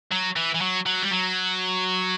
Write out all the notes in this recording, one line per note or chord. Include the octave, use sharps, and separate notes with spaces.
F#3
E3
E3
F#3
F#3
G3
F#3